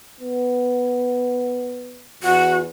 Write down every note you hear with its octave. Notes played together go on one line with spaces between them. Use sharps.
B3
E2 F#4